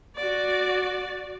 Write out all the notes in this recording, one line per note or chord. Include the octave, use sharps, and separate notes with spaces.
F#4 D5